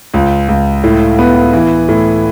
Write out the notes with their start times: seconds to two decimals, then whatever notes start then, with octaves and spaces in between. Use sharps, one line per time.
0.14 C#2
0.48 C#2
0.84 A2
1.19 B3
1.53 E3
1.89 A2